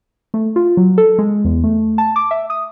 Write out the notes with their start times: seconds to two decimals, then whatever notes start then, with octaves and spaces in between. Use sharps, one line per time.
0.34 A3
0.56 F4
0.77 F#3
0.98 A4
1.18 G#3
1.45 E2
1.64 A3
1.98 A5
2.16 D6
2.31 E5
2.50 D#6